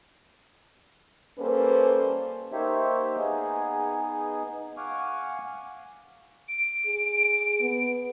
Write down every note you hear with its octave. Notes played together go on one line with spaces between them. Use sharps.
G3 A#3 C#4 A4 B4 C5
A#3 D#4 G4 C5 C#5 E5
B3 D#4 G#4
F5 F#5 G#5 C#6 D6
D7
G#4
B3